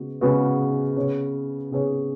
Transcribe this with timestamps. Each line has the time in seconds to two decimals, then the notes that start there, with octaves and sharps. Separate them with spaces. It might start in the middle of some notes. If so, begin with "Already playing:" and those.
Already playing: C#3 G#3 B3 F#4
0.21 C#3 G#3 B3 F#4
0.96 C#3 B3 G#4 C#5
1.71 C#3 B3 G#4 C#5